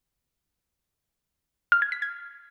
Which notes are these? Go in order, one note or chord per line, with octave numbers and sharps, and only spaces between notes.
F6
G#6
B6
G#6